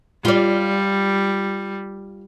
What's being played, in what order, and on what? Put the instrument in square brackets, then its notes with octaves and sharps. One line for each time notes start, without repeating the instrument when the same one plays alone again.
[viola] G3 [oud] F4 D5